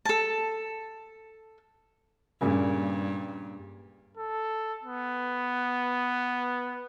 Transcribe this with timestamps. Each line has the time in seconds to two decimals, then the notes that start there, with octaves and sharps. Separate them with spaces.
0.05 A4 A5
2.41 G2 A#2 C#3
4.17 A4
4.83 B3